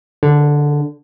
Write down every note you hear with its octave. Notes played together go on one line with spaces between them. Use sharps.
D3